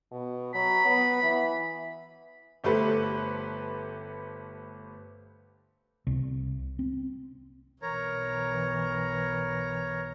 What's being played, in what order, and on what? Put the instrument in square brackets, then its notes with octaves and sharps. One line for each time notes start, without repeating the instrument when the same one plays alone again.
[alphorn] B2
[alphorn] F#3 [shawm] B5
[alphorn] B3
E3
[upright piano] G1 A3 G4 A4 B4 C5
[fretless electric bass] C2
C4
[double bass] B1 E3 [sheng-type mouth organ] A#4 C#5 A#5